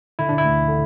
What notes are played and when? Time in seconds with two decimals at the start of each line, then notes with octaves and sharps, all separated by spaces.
0.19 D3 E4
0.29 D4
0.38 E4
0.43 D2
0.68 D3